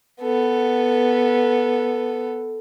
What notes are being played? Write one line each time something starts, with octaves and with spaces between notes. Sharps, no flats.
B3 A4